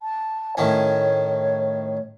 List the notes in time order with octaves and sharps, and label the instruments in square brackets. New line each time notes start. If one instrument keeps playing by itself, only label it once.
[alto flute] A5
[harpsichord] A2 D#3 C#4 [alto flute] C#5